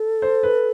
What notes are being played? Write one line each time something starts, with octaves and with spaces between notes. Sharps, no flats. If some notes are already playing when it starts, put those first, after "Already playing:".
Already playing: A4
C5
B4